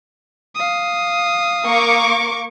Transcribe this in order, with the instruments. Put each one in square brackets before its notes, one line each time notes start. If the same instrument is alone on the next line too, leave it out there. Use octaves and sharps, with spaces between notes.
[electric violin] F5 D#6
[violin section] A#3 C#6 D6